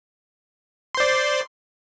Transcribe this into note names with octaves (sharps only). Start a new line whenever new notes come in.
C5 D5 C6